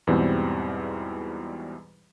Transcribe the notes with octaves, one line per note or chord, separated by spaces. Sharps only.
E2 G#2 B2 E3 G3 C4